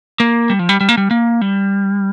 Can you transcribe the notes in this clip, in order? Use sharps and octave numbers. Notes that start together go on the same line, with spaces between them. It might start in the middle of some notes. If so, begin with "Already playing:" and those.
A#3
G3
F3
G3
G3
A#3
G3
A#3
G3